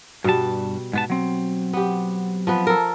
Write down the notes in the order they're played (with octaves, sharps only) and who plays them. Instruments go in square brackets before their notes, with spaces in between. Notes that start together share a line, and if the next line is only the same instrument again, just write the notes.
[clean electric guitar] G2 A5 [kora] B2 G3
[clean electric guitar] G#2 B3 A5
F#3 C4
[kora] B3 G4
F3 B3 B4
A4 A#4